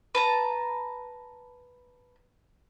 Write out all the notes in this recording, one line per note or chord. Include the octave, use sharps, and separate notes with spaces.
B4 A5 A#5